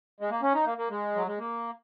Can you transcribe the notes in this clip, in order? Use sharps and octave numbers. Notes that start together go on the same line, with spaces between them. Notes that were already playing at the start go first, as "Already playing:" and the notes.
G#3
A#3
C#4
D#4
A#3
A#3
G#3
F#3
G#3
A#3